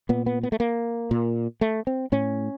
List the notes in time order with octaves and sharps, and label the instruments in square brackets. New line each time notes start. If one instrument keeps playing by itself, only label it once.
[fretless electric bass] A#2 B3
B3
B3
A3
A#3
A#2
A3
C4
A2 C#4